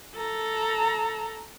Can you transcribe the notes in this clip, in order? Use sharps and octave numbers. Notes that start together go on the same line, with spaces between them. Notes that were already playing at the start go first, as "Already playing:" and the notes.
A4 A#5